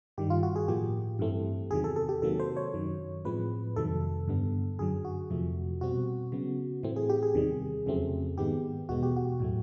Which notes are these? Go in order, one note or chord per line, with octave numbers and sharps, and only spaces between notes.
G2 D#3 G3 G4
F4
F#4
G#4
A2 F3 A#3 G4
G2 E3 A3 C4
E2 C3 D#3 F#3 G#4
A4
A4
G4
C3 D#3 F#3 A#3 A4
C5
C#5
F#2 D#3 F#3
A2 F3 G#3 C4 B4
F2 C3 D#3 F#3 A3 A4
G2 D3 G3 B3
F#2 D3 F#3 G#4
F#4
F2 C3 F3 A3
B2 G3 C4 F#4
C#3 F#3 B3
A2 E3 A3 C4
G#4
G4
G#4
E2 C3 D#3 G3
F2 C#3 F#3 A3 C4
G#2 D#3 G#3 B3 G4
E2 B2 G#3 B3 F#4
G4
F#4
A2 F#3 A3